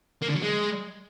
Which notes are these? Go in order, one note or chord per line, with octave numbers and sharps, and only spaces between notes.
A#3
D3
F#3
G#3